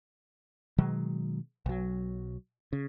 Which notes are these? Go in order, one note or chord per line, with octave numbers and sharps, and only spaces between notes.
B2 D#3 F#3 G#3
B1 F#3
C#3